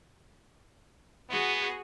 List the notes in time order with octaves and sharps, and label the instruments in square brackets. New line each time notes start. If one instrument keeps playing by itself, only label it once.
[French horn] B3 [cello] F#4 G#4